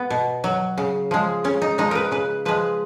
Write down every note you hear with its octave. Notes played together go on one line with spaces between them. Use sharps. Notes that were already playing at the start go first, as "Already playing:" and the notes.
Already playing: B3
B2
F#3
C#3
F3 G#3
C#3 C#4
D#4
F3 G#3 D#4
A#4 B4
C#3 B4
F3 G#3 B4